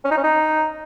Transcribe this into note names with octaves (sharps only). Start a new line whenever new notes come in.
C#4
D#4
C#4
D#4